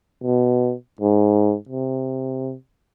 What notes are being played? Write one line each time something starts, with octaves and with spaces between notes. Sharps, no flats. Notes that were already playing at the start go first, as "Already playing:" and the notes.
B2
G#2
C3